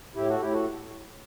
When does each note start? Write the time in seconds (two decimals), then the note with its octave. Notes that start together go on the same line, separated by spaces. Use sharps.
0.15 A2 E4 G4
0.28 F#4 A4
0.39 A2 E4 G4
0.52 F#4 A4